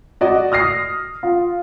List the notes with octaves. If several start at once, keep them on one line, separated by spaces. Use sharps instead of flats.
F#4 D5 D#5
D#6 F6 A#6 C7
F4